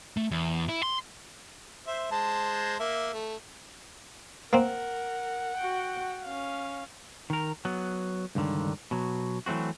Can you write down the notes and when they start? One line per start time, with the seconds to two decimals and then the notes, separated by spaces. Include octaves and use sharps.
0.17 A3
0.31 E2
0.69 E4
0.83 C6
1.87 C5 E5
2.11 G#3 C5 A5
2.79 A#3 E5
3.13 A3
4.53 A#3 C4 A#4 F#5
5.57 F#4 G5
6.23 C#4 F5
7.30 D#3 A#4
7.65 F#3 B3
8.35 C#2 G2 A#2 D3 D#3
8.91 B2 F#3
9.46 E3 F#3 A3 C4 F#4